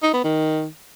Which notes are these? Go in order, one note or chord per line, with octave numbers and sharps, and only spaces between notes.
D#4
B3
D#3